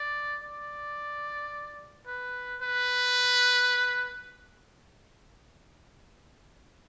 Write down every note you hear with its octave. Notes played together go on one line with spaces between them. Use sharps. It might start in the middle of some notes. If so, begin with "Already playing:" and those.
Already playing: D5
D5
B4
B4